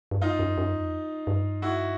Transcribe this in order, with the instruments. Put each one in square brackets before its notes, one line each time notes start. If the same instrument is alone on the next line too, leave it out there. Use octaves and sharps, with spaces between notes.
[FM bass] G2
[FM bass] F#2 [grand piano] D#4 F4
[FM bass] F#2
F#2
F2
G2
[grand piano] E4 F#4